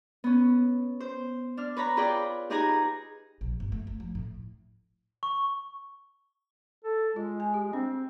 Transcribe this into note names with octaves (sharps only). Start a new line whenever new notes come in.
B3 C#4
C5
D4 F6
B4 C#5 A#5 B5
F4 G#4 B4 D5 G5 B5
D#4 G4 G#4 B4 G#5 A#5
A#1
G1
A3
A3
F3
A2
C#6
A4
G#3 F4
G#5
G4
C4 D4